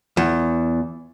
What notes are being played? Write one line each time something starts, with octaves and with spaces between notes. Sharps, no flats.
E2